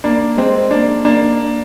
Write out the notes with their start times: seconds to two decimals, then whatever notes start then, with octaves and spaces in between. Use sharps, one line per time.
0.04 A#3 D4
0.37 G#3 C4
0.71 A#3 D4
1.05 A#3 D4